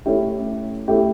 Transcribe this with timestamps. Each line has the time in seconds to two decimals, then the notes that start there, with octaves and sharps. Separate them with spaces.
0.06 A3 C#4 E4 G4
0.88 A3 C#4 E4 G4